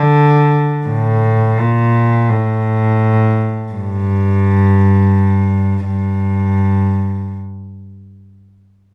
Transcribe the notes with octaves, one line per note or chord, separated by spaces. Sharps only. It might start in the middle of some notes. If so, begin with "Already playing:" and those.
Already playing: D3
A2
A#2
A2
G2
G2